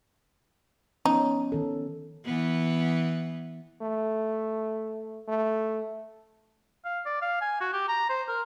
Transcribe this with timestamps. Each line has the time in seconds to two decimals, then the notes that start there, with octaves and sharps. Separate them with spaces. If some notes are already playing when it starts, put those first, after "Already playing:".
1.05 F3 B3 C#4 D#4
1.52 D#3 A4
2.26 E3 B3
3.82 A3
5.28 A3
6.85 F5
7.06 D5
7.22 F5
7.41 G#5
7.61 F#4
7.73 G4
7.89 A#5
8.09 C5
8.28 A#4